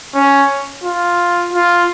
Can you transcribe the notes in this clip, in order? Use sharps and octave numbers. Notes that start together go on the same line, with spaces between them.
C#4
F4
F4